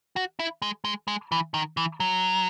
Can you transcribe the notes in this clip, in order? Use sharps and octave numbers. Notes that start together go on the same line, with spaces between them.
F#4
E4
G#3
G#3
G#3
E3
D#3
E3
F#3